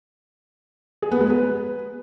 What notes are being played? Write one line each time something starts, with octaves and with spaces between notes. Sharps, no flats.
G#4
B3
G#3
B4